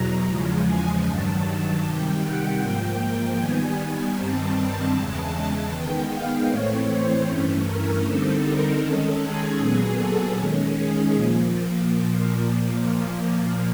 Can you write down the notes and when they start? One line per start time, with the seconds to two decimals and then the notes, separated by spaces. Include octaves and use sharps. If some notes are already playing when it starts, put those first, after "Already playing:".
Already playing: E2 B2 F#3 A#5
0.28 E2 C#3 F3 G#3
0.67 G#5
1.05 G2 D#3 F#3 A5
1.45 A5
1.84 C3 D#3 G3 G5
2.23 F#5
2.60 G#2 F3 A#3 G5
3.38 D#3 G3 B3 G#5
4.16 G2 D#3 G3 C4 A5
4.94 E2 C#3 E3 G#3 A5
5.71 D#3 G#3 B3 G5
6.10 F5
6.48 A2 E3 A3 C4 C#5
6.88 C5
7.26 G2 E3 A3 C#4
7.65 A#4
8.03 D3 G3 C4 D#4 A4
8.42 A#4
8.80 D#3 G#3 C#4 A4
9.20 G#4
9.58 A#2 F#3 B3 G#4
9.98 A4
10.36 D#3 G#3 C#4
10.75 G#4
11.14 A#2 F3 A#3